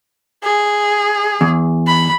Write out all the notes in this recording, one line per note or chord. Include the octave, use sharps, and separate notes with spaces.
G#4
E2
B5